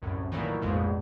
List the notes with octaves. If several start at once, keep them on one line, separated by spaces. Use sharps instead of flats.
C2 F#2 A2
A#2 D#3 E3 F#3 A3 A#3
A#1 F2 G#2 B2